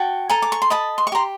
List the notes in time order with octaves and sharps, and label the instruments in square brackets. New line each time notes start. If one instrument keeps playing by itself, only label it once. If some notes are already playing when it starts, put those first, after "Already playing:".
Already playing: [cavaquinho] F#4 G5 A5
A4 G#5 A#5
D6
C#6
C6
D#5 A5 B5
C6
C#6
G4 A#5 C6